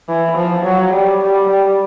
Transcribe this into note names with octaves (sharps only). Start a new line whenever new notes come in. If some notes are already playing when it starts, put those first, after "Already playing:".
E3
F3
F#3
G3
G3
G3